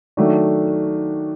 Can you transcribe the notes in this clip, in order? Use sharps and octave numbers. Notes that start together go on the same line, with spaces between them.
D#3 F#3 A3 D4 F#4